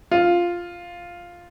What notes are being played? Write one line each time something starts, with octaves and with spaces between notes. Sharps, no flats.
F4